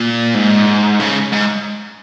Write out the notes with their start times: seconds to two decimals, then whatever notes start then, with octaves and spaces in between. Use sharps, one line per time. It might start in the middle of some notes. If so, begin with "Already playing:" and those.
Already playing: A#2
0.34 G#2
1.00 C#3
1.32 G#2